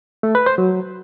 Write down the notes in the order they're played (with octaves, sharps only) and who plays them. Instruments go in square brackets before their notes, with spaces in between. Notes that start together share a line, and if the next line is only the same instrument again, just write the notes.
[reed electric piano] A3
B4
C5
F#3